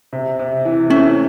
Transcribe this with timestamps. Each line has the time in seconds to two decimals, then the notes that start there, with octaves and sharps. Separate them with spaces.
0.13 C3
0.39 C3
0.65 E3
0.90 A3 C#4